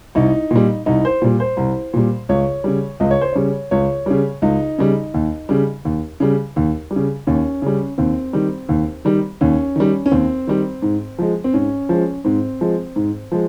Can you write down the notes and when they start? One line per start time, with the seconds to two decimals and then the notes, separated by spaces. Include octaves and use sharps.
0.15 C2 D#4
0.51 A#2 G3
0.86 C2 D#4
1.05 C5
1.22 A#2 G3
1.40 C5
1.57 C2
1.93 A#2 G3
2.29 C#2 C#5
2.64 C#3 G3
3.00 C#2 D#5
3.11 C#5
3.21 C5
3.33 C#3 G3 C#5
3.71 C#2 C#5
4.06 C#3 G3
4.42 C#2 D#4
4.78 C#3 G3
5.14 D#2
5.49 C#3 G3
5.85 D#2
6.20 C#3 G3
6.56 D#2
6.91 G3
6.96 C#3
7.27 D#2 C#4
7.62 C#3 G3
7.98 D#2 C4
8.33 D#3 G3
8.69 D#2
9.05 D#3 G3
9.41 D#2 C#4
9.76 D#3 G3
10.06 C#4
10.11 D#2 C4
10.47 D#3 G3
10.82 G#2
11.19 F3 G#3
11.44 C4
11.53 G#2 C#4
11.89 F3 G#3
12.24 G#2 C4
12.61 F3 G#3
12.96 G#2
13.32 F3 G#3